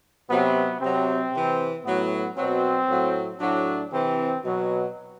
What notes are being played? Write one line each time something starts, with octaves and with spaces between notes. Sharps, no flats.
C3 F#3 B3
C3 F#3 C4
C3 E3
A2 F#3 B3
B2 F#3 C4
A2 F#3
A2 F#3 D4
C3 E3 C4
B2 F#3